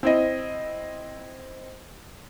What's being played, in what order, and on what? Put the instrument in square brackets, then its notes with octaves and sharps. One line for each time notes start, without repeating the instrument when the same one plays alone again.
[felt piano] C4 E4 D#5